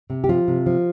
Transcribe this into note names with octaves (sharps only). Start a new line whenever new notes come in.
C3
G4
F3 F4
C3
F3